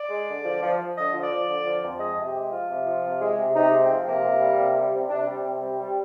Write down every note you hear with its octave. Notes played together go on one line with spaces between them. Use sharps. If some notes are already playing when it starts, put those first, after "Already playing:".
Already playing: D5
G#3
D3
F3
F3
F3
D3 D#5
F3
D5
F3
D3
F3
F2
G#3 D#5
C3
G4
G#3
F3 F4
C3
F3
C3
G#3
C3
C3 D#4
G#3
C4
F3
C3 A#3
C3
G3
C3
G3
C3
C3 D4
G3
C4
C3
G3 C4
G3